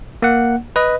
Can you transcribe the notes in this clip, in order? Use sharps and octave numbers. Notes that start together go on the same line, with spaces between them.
A#3 F#5
B4 D#5